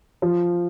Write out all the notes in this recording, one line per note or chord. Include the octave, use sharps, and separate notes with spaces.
F3